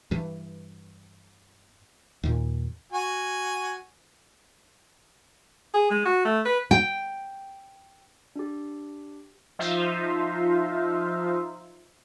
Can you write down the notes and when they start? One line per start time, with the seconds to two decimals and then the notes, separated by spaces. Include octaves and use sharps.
0.11 G2 E3
2.24 D#2 A#2
2.92 F#4 G#5
5.74 G#4
5.91 G#3
6.05 F#4
6.25 A3
6.45 B4
6.71 G5
8.36 D4 G4
9.59 F3 D#4 F4 C5 E5 F5